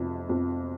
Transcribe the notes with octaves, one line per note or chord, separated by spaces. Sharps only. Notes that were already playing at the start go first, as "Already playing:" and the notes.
Already playing: F1 F2 C3
F2